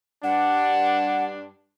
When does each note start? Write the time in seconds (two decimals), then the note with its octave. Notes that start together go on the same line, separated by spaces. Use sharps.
0.24 G2 D4 F#5